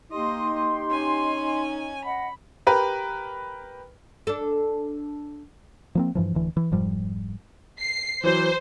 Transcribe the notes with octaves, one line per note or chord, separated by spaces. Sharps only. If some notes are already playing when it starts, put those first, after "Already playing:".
A#3 D#4 G4 D#5 C6
C#4 G#5
D#5 F#5 B5
G4 A#4 B4
D4 A4
F3 A#3 C4
G2 E3 F3
D1 D2 E3
E3
F1 G#2 F3 G3
C7
E3 F#3 C5